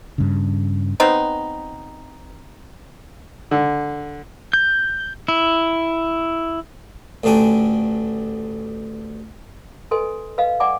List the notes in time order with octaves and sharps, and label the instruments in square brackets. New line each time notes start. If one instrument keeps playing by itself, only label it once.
[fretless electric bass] G2 C#3
[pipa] B3 C4 D#4
[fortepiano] D3
[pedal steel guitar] G6
E4
[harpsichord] A1 D2 D3 D4 G5 G#5
[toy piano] A4 B4 D#5 G#5 C6
B4 D#5 F5
D5 F#5 G#5 D6